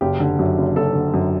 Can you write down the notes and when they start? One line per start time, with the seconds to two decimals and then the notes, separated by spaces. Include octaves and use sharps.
0.01 F#1 G4
0.20 D3
0.39 F#2
0.58 F#1
0.76 F#1 A4
0.95 D3
1.14 F#2